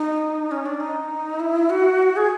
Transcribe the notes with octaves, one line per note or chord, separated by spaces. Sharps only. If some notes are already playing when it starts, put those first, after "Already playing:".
Already playing: D#4
C#4
D4
D#4
E4
F#4
G#4